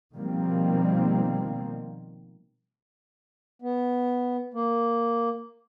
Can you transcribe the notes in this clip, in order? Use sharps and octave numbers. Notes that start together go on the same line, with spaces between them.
B2 D#3 F3 G3 A#3 C4
B3
A#3